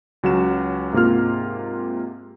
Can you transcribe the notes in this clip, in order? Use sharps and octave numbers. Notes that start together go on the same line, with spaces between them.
C#2 F#3 C#4 F#4 E7
G#2 C3 A#3 F4 F6